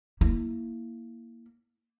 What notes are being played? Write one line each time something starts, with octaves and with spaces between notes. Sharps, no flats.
A#3 E4